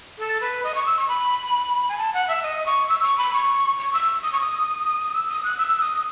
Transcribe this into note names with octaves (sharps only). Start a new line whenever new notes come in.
A4
B4
D#5
C#6
E6
C#6
B5
G#5
A5
F#5
E5
D#5
C#6
E6
C#6
B5
C#6
C#6
E6
D#6
C#6
D#6
E6
D#6
F#6
E6
D#6